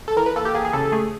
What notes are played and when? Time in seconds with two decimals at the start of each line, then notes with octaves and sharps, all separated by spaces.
0.08 A4
0.17 E3 A#4
0.26 B4
0.36 A#3 A4
0.45 G4
0.54 A#3 G#4
0.65 G#4
0.73 C#3 A4
0.85 A4
0.92 A3 G#4